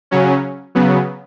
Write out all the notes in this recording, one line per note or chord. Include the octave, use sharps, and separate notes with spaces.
C#3 F#3 C#4
C#3 F#3 B3